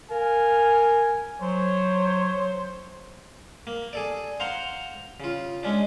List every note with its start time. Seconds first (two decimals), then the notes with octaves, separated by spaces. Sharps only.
0.11 A#4 F5 G#5
1.42 F#3 C5 C#5
3.67 A#3
3.93 G#4 A4 D5
4.40 C5 F5 F#5 A#5 C6
5.20 C#3 F4
5.63 G#3 C#4 D4